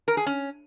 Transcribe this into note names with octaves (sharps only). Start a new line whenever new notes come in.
A#4
G#4
C#4